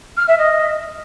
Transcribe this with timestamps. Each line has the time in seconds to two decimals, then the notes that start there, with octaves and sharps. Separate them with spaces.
0.17 F6
0.28 E5
0.38 D#5